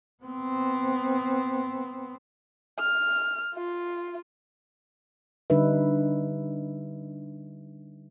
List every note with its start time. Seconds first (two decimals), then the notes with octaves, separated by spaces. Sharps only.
0.24 B3 C4
2.79 F6
3.55 F4
5.50 D3 G3 D4 D#4 B4 E5